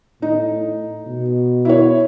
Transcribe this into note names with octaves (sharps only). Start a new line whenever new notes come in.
A2 D#4
B2
E4 C#5